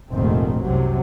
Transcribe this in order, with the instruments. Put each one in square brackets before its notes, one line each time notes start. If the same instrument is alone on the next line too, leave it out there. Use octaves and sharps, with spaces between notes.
[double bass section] F1 A#1 G#2 D#3 A3 C4
C2 F#2 C3 F#3